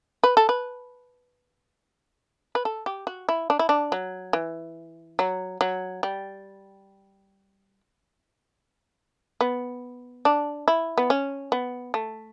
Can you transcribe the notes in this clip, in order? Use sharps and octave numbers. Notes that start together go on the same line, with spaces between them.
B4
A4
B4
B4
A4
G4
F#4
E4
D4
E4
D4
F#3
E3
F#3
F#3
G3
B3
D4
E4
B3
C#4
B3
A3